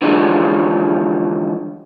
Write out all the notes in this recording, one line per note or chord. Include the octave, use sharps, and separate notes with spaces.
D3 E3 F3 G3 G#3 C#4